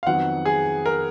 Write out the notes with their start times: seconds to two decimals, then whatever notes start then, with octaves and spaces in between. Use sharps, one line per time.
0.03 F5
0.06 F2 D#3 F#3 B3 F#5
0.45 G#4
0.86 A#4